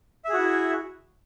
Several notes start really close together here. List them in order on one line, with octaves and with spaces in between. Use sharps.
E5 G#4 F#4 E4